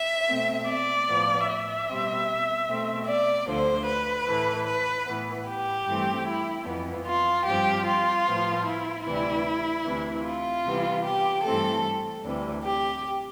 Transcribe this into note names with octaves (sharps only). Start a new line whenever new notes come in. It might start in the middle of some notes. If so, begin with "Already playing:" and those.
Already playing: E5
B2 A3 C4
D5
A2 F3 B3
E5
B2 G3 C4
B2 A3 C4
D5
D2 D3 F3 C5
B4
A2 E3 A3
B4
A2 E3 B3
G4
G2 E3 A3 C4
E4
F2 E3 B3
F4
G2 F3 C4 G4
F4
A2 F3 B3
E4
D2 C3 E3 G3 E4
D2 C3 E3
F4
C3 E3 G3 B3
G4
G2 E3 A3 C4 A4
D2 C3 E3 G3
G4